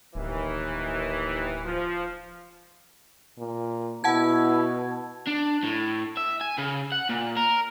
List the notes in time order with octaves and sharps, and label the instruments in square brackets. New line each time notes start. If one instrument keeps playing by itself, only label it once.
[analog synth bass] D1 [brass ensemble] D#2 D#3 E3
[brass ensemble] F3
[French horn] A#2
[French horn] B2 [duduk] E4 [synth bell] F#5 A5 G#6
[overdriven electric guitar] D4
A2
E5
G#5
C#3
F#5
A#2
A#4